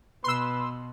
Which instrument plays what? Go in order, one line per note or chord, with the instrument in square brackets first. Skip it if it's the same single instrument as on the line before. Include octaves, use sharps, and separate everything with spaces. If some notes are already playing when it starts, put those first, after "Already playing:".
[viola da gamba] B2 [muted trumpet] B4 [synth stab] C6 E6